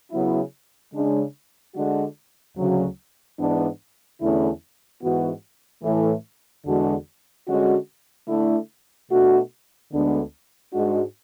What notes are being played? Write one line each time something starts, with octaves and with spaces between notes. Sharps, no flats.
C#3 F#3 B3 E4
C#3 G#3 D4
D3 G#3 D4 F#4
D2 C#3 F#3
G#2 E3 B3 D4
E2 D3 A3 C#4 E4
G#2 E3 B3 F#4
A2 E3 A3
E2 D3 G#3 D4 F#4
D3 G#3 C#4 F#4
D3 A3 E4
B2 A3 D4 F#4
D2 D3 G#3 B3 D4
G#2 G#3 D4 F#4